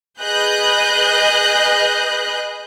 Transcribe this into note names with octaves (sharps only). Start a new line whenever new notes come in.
G#4 B4 D#5 F#6 G6